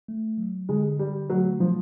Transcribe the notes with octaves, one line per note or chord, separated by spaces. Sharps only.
A3
F#3
D3 G#3
D3 G3
F#3 A3
F3 F#3